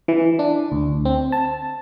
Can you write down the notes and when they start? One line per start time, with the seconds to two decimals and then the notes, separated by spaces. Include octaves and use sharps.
0.08 E3
0.39 D4
0.72 D2
1.05 C4
1.32 A5